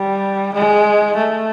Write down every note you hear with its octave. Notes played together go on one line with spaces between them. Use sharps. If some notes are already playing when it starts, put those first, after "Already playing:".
Already playing: G3
G#3
A3